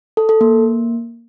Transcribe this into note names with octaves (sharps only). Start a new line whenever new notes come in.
A4
A4
A#3